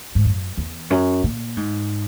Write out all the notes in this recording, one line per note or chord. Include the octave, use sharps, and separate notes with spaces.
G#2
F#2
E2
F#2
A#2
G#2